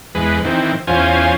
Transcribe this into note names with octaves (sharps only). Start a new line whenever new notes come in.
E2 G#3 B4
D#3 E3 C4
E2 C#4 F4 C5 G#5